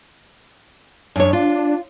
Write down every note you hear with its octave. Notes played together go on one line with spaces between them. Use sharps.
F#2 D4 C#5
F4